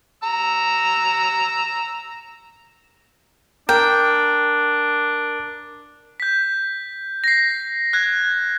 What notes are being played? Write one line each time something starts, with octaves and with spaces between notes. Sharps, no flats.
A#5 E6
D4 A#4 G5
G6 B6
A#6 C7
F#6 G#6